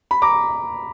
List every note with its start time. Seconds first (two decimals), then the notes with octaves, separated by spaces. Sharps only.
0.11 B5
0.22 A#5 D6